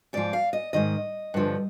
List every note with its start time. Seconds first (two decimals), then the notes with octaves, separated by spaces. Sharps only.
0.13 G#2 F3 D5
0.33 F5
0.53 D#5
0.73 G#2 D#3 D#5
1.34 G2 D3 F3